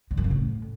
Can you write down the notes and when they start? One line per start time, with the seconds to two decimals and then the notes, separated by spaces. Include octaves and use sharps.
0.11 D3
0.17 F#2
0.24 C#3
0.31 A2